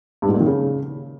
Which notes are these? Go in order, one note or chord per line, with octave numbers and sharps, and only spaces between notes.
G2
G#2
A#2
D#3
C#3